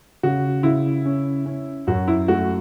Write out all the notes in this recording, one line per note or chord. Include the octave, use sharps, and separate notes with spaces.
C#3 F#4
C#3 E4
C#4
C#4
F#2 F#4
E4
A3 F#4